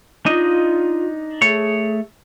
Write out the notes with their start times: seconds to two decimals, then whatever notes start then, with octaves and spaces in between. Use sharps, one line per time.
0.26 D4 D#4 F4 D#5
1.42 A3 G#4 C#5